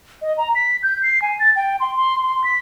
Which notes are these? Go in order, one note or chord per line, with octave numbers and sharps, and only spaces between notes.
D#5
A#5
B6
G6
C7
G#5
A6
G5
C6
C6
C6
B6